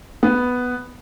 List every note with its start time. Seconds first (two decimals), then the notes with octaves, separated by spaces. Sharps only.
0.23 B3